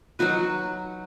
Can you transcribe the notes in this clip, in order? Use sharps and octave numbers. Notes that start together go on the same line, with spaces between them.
F#3 D#4 F#4 B4